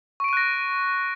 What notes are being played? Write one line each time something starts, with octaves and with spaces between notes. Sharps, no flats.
C#6 F#6 A#6 D7 D#7